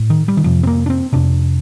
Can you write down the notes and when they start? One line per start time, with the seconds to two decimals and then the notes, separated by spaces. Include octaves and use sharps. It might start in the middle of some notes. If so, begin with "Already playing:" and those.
Already playing: A2
0.10 D#3
0.28 G3
0.37 D#3
0.44 F2 C3 F3
0.63 C4
0.67 A#3
0.86 D4
0.90 C4
1.13 F2 C3 D4